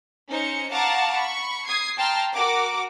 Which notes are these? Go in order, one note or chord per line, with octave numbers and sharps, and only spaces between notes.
C#4 D#4 C5 C#7
F5 F#5 A5 A#5 C#6 D6
B5 C#6
D#6 G#6 C7
G5 A5 A#5 C6 F6
F#4 A#4 F#5 D6